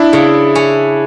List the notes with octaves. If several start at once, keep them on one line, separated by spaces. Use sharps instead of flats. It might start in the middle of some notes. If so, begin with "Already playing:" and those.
Already playing: D4 E4
C#3
C#4